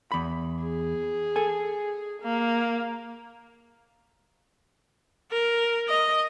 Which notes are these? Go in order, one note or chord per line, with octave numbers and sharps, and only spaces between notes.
E2 B5
G#4
A4 G#5
A#3
A#4
D#5